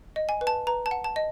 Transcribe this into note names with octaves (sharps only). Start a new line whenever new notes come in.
D#5
G#5
B4
A5
B4 A#5
A5
F#5
A5
D#5